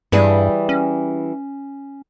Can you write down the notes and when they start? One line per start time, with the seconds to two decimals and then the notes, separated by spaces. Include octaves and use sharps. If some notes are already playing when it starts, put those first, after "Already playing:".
0.12 G2 E3 G3 G#4
0.69 C#4